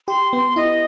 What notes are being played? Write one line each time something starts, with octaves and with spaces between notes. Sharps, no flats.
G4 C6
B3 C6
E4 D#5